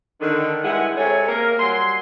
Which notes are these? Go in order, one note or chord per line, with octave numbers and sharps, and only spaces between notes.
D3 D#3
G2 G#3 E4 G#4 F#5
C3 G#3 G#4 A4 C#5
A#3 A#4
F#3 G3 G#5 C6